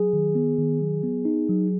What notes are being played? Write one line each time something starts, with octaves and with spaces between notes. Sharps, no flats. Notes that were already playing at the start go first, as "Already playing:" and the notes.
Already playing: F#3 G#4
D#3
B3
D#3
F#3
B3
D#4
F#3